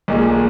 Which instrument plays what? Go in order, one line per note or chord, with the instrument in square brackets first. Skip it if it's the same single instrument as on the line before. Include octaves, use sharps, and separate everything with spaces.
[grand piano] B1 A#2 G#3